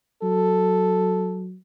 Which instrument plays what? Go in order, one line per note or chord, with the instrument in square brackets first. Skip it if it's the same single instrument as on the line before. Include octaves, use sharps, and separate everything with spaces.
[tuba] F#3 [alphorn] A4